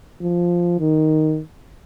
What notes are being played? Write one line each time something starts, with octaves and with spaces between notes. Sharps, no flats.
F3
D#3